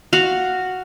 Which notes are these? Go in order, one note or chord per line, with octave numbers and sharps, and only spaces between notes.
F#4 F5